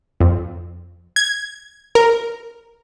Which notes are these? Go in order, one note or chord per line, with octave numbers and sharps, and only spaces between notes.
F2
G#6
A#4